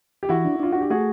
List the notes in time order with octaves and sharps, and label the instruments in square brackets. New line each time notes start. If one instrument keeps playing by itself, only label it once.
[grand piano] G4
[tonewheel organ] E3 [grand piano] E4 F#4
[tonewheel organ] D4
[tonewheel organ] D4 [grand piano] F4
[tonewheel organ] D4 [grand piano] F#4
[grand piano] G4
[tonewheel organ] A3 [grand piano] F#4 G#4